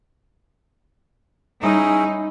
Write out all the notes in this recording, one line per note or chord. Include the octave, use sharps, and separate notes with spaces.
G3 C#4 D#4 E4 G#4